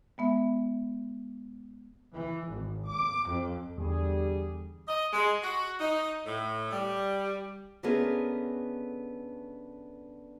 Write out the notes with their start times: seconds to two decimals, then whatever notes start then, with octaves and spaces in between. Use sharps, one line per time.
0.18 G#3 B3 E5
2.16 E3
2.49 G#1
2.89 D6
3.28 F2
3.78 E2 D3 G3 G#4
4.88 D#5
5.13 G#3
5.43 F#4
5.80 D#4
6.26 A2
6.71 G3
7.83 D3 A3 B3 C#4 G#4 A#4